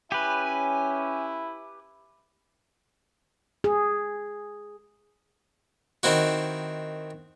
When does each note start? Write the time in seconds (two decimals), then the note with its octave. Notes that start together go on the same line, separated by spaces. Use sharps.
0.12 C#4 E4 G4 B4 G#5
3.64 G#4
6.03 D#3 C4 E4 F#4